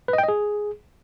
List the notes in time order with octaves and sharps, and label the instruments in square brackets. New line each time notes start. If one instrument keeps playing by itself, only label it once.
[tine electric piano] B4
D#5
G5
D#5
G#4